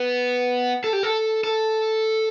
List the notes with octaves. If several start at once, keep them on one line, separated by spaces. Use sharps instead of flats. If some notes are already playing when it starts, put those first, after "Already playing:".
Already playing: B3
A4
G4
A4
A4